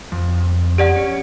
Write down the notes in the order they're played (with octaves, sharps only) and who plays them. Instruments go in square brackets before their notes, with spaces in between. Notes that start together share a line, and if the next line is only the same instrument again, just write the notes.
[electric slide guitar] F2
[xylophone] G4 D5 F#5
[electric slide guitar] C#4